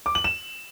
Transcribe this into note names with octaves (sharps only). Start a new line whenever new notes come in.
D6
F#7
E7